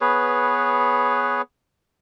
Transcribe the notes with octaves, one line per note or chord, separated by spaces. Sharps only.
B3 G#4 B4 C#5